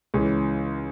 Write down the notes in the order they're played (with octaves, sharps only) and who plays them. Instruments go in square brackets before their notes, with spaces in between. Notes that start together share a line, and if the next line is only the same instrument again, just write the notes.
[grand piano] C#2 C#3 E3